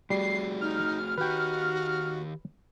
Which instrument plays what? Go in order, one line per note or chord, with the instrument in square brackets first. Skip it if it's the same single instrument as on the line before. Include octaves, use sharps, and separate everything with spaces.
[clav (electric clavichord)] G3 [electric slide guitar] A3 F#4 G#4 [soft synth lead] C7
[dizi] D#4 [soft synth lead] F6
[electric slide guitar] D#3 G4 [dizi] F#4 [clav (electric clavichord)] B4 G5